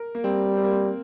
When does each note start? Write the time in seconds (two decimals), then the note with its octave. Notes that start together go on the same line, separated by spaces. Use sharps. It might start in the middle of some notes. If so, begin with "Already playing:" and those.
Already playing: A#4
0.15 A#3
0.24 G3 C4
0.57 C4
0.64 A#3
0.71 C4